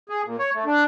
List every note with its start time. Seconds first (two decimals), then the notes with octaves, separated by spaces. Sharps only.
0.09 G#4
0.24 A#2
0.39 C#5
0.54 A3
0.65 D4